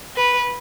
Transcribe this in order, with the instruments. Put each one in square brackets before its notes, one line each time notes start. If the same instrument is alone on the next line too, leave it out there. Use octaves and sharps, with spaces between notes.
[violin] B4